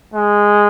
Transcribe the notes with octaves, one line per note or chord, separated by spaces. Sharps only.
G#3